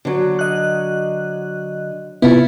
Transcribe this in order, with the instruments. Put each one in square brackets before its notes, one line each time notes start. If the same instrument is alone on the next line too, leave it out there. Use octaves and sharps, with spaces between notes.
[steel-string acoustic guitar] D3 F#3
[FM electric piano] D#5 F#6
[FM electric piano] C3 B3 [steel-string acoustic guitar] E4 F4